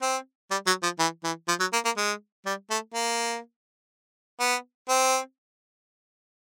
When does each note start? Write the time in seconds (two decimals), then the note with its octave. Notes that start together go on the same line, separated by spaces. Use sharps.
0.02 C4
0.51 G3
0.67 F#3
0.83 F3
0.99 E3
1.24 E3
1.48 F3
1.60 F#3
1.73 A#3
1.85 A#3
1.97 G#3
2.46 G3
2.70 A3
2.94 A#3
4.40 B3
4.89 C4